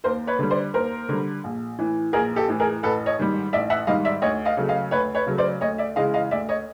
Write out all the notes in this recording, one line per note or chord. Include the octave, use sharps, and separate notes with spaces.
D#2 A#4 C5
B4 C#5
D3 G3
C5 D5
D#2 A#4 C5
D3 G3
A#1
A2 E3
A#1 G#4 A#4
G4 A4
A2 E3
G#4 A#4
A1 A4 B4
C#5 D#5
G#2 D#3 G3
A1 D5 E5
E5 F#5
G#2 D#3 G3 D#5 F5
D5 E5
D2 C#5 D#5
D#5 F5
C#3 F#3 A3
D#5 F5
D2 B4 C#5
B4 C#5
C#3 F#3 A3
C5 D5
D2 C#5 D#5
D5 E5
C#3 E3 G#3 D#5 F5
D#5 F5
D2 D5 E5
C#5 D#5